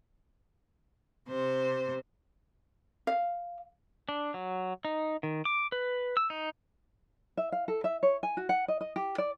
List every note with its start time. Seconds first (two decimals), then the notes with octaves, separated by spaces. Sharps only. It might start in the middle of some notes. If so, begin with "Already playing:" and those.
1.27 C3 C5
3.07 F5
4.09 D4
4.34 F#3
4.85 D#4
5.23 D#3
5.45 D6
5.72 B4
6.17 E6
6.30 D#4
7.37 E5
7.52 F5
7.68 A4
7.84 E5
8.03 C#5
8.23 G#5
8.37 F#4
8.49 F#5
8.68 D#5
8.81 D#5
8.96 G4
9.18 D5